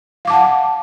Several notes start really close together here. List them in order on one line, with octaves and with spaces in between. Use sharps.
F5 D6 A5 F#5